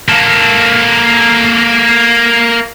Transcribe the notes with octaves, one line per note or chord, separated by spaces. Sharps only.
A#3 A4